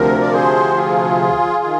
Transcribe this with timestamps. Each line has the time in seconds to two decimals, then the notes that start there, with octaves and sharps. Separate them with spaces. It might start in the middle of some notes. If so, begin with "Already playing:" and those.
Already playing: D2 C3 F3 A#4
0.21 D5
0.32 G#4 C5
0.76 F4 G#4
1.64 D#3